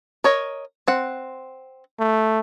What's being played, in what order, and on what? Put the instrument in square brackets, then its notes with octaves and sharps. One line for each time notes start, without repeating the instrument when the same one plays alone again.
[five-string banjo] A#4 C#5 D#5
C4 F#5
[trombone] A3